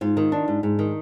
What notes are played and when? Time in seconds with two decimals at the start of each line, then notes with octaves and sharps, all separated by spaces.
0.01 G#2 F4
0.17 D#3
0.32 D4
0.48 G#2
0.63 G#2
0.79 D#3